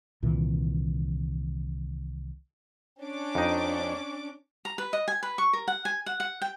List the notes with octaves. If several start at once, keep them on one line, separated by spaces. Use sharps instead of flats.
C2 A#2 D#3 E3
C#4 D4 D6
F2 D#4
A#5
B4
D#5
G#5
B4
C#6
A#4
F#5
G#5
F#5
F#5
G5